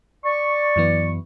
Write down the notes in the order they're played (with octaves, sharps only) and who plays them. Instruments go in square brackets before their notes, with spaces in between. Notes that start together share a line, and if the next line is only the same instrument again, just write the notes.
[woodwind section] D5 C#6
[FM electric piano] F#2 E3 B3